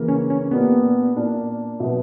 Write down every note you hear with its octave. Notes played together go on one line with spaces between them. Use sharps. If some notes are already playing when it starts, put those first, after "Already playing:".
Already playing: C#3 E3 A#3 E4 A#4
C#4
C#4
A#2 A#3 B3 D4 G4
A#2 A#3 D4
B2 F#3 B3